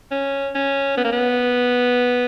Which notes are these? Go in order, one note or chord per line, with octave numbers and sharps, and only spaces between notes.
C#4
C#4
B3
A#3
B3